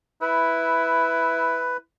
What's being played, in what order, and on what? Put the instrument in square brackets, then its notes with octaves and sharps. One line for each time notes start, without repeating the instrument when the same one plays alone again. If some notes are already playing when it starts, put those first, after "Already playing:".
[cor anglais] E4 [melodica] B4